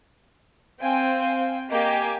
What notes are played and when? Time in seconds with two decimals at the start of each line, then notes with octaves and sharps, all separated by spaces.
0.81 C4 F5 G5 G#5
1.70 A#3 G4 D#5 G#5